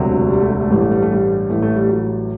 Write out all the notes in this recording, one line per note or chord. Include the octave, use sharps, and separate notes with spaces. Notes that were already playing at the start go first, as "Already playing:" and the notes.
Already playing: E1 D2 C3 F#3
G3
A3
G3
A3
A1 G2 E3 G3
A3
G3
A3
G3
A1 A2 E3 A3
A3
G3
F#3